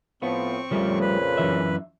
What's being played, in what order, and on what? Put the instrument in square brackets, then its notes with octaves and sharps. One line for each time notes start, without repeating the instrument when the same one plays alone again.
[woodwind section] A2 F3 [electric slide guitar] B3 [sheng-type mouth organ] C4 C#6
[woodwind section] F2 A#2 C#3 [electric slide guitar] F3 G3 A3
[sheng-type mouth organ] B4
[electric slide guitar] F#2 E3 E5